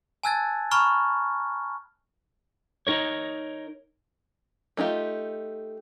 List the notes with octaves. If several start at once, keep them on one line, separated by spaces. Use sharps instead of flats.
G#5 A5 E6 F#6 G#6 A6
G#5 A#5 B5 C#6 F6
D#4 A#4 C#5
A3 D#4 F4 G4